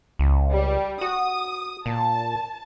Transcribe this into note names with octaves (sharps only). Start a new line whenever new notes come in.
C#2
G3
F#4 D#6
A#2 A5